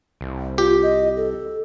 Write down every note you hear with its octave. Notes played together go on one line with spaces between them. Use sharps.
C2
F4 G4
D#5
A4